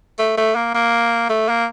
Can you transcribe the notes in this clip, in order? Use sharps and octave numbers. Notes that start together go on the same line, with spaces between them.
A3
A3
A#3
A#3
A3
A#3